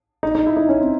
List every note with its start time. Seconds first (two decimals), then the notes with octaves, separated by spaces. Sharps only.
0.23 D#4
0.35 D#4
0.46 E4
0.57 D#4
0.69 C#4
0.81 C4